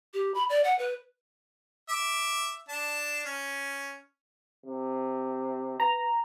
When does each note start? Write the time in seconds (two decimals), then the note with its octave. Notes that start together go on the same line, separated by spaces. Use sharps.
0.14 G4
0.35 B5
0.49 D5
0.64 F#5
0.79 B4
1.89 E5 D6
2.69 D4 A5
3.26 C#4
4.66 C3
5.80 B4 A#5